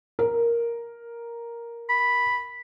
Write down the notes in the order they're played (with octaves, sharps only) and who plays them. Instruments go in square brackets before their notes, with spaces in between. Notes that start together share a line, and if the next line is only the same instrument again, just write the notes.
[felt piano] A#4
[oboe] B5